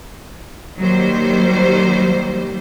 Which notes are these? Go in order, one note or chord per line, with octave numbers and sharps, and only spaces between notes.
D#3 F#3 G3 A#3 C5